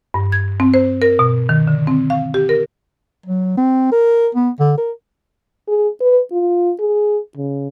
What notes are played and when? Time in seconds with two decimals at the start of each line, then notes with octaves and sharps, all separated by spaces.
0.14 G2
0.32 G#6
0.60 C4
0.74 C5
1.02 A#4
1.19 B2
1.49 D#3
1.68 D3
1.87 C4
2.10 F5
2.34 G4
2.49 A#4
3.26 F#3
3.57 C4
3.92 A#4
4.35 B3
4.60 D3
4.78 A#4
5.68 G#4
6.01 B4
6.32 F4
6.80 G#4
7.37 C#3